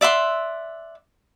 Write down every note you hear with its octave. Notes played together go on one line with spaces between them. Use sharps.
D5 E5 F#5 C6